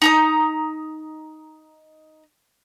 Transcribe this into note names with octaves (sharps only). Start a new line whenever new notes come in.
D#4 A#5 D#6